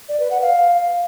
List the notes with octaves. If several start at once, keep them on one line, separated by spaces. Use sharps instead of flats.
D5
B4
F#5
F5